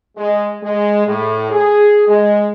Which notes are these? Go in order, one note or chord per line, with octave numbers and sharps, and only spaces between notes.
G#3
G#3
A2
G#4
G#3